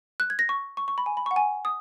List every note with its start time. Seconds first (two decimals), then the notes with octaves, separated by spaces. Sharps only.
0.20 F#6
0.30 G#6
0.39 A#6
0.49 C#6
0.77 C#6
0.88 C#6
0.98 B5
1.06 G#5
1.17 B5
1.26 C#6
1.31 F#5
1.36 G#5
1.65 D#6